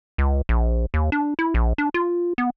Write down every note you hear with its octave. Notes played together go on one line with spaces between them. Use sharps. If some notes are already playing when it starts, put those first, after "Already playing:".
C#2
A#1
D#2
D4
E4
A#1
D4
F4
B3